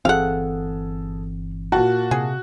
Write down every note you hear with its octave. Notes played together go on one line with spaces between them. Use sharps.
G1 E3 C4 G#4 A4 F5 F#5
A#2 F#4 A5
C3 G#4